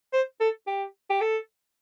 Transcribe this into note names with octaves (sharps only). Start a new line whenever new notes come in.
C5
A4
G4
G4
A4